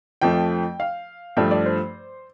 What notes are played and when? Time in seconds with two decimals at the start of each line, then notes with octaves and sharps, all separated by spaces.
0.21 F2 F3 A3 G5
0.80 F5
1.37 G2 F3 A3 D4 G5
1.51 D5
1.66 C5